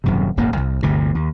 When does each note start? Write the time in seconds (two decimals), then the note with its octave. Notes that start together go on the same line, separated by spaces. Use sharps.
0.04 D#1 F#2 C3
0.37 D#1 G#1 F#2 A#3
0.57 C2
0.83 G1 D2 C3
1.15 D#2